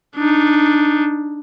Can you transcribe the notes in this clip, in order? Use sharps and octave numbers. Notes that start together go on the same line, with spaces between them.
D4 D#4